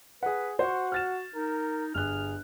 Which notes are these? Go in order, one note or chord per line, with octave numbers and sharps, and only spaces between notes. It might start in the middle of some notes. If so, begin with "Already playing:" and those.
G#4 B4 F#5
F#4 C5 F#5 C#6
F6 A6 E7
D#4 A#4
G1 G#4 F6 F#6